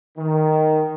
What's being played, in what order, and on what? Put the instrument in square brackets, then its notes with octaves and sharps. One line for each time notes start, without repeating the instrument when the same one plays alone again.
[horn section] D#3